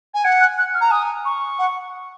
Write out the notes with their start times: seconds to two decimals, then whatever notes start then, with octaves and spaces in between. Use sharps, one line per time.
0.14 G#5
0.24 F#5 G#6
0.41 F#6
0.58 F#6
0.75 F6
0.81 A#5
0.91 G#5 D#6
1.25 C#6
1.59 F#5